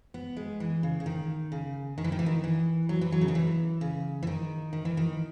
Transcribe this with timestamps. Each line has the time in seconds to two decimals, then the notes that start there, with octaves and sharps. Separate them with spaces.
0.14 B3
0.37 G#3
0.60 E3
0.83 C#3
1.00 C#3
1.06 D#3
1.52 C#3
1.98 D#3
2.04 E3
2.12 D#3
2.19 E3
2.26 D#3
2.44 E3
2.89 F#3
3.01 E3
3.12 F#3
3.21 C#3
3.28 D#3
3.35 E3
3.81 C#3
4.23 E3
4.27 D#3
4.73 D#3
4.85 E3
4.97 D#3